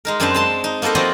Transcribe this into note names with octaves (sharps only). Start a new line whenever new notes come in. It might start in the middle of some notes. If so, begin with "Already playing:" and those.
G#3 D#4 A#4
F#2 C4 D4 B4 C5 A5
G#3 A5 C6
D#4
A#3 B3 A4 A#4 C5
F3 C4 F4 F#4 D5 D#5